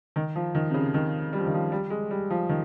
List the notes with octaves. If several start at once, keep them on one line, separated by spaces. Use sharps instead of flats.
D#3
F3
D#3
C3
C#3
D#3
G3
F3
D#3
F3
G3
G#3
G3
F3
D#3